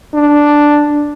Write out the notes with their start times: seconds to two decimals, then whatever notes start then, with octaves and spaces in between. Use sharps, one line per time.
0.14 D4